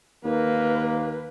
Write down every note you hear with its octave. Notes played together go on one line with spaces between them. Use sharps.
D#2 A#3 B4